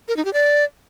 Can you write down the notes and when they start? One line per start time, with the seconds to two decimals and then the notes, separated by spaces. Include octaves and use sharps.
0.08 A#4
0.17 D#4
0.25 G4
0.33 D5